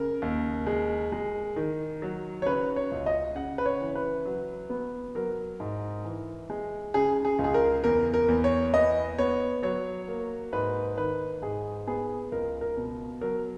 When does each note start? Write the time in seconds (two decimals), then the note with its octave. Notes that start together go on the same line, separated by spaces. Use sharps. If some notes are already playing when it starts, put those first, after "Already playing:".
Already playing: C#3 A#4
0.22 D#2
0.66 G#3
1.12 G#3
1.56 D#3
2.02 F#3
2.42 C#5
2.46 C#3 B4
2.76 C#5
2.91 C#2
3.06 D#5
3.35 C#3 F#5
3.58 B4
3.66 C#5
3.81 E3
3.95 B4
4.25 F#3
4.70 B3
5.15 F#3 A#4
5.60 G#2
6.05 E3
6.50 G#3
6.94 C#3 G#4
7.25 G#4
7.39 C#2
7.44 G#4
7.54 A#4
7.84 E2 A#4
8.14 A#4
8.28 E2
8.44 C#5
8.74 B3 D#5
9.18 B3 C#5
9.63 F#3 C#5
10.08 A#3
10.53 G#2 B4
10.98 D#3 B4
11.42 G#2 G#4
11.87 B3 G#4
12.32 C#2 A#4
12.61 A#4
12.77 B2
13.21 F#3 A#4